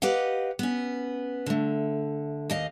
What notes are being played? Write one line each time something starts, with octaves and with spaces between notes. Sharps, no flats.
G4 B4 D#5 F5 F#5
B3 C#4
D3 A3
D#2 D#5 F5